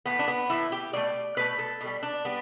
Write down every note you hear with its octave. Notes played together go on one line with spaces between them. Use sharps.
A2 E3 A3 B3
D4
B3
A2 E3 A3 E4
G4
B2 A3 D5
B2 A3 B4
A4
B2 G3
D4
G3 B3